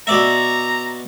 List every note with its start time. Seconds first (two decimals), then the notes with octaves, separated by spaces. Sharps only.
0.07 B2 D5 E5 A#5